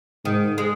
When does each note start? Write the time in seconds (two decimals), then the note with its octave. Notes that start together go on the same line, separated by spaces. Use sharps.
0.25 G#2 D#3
0.58 G#3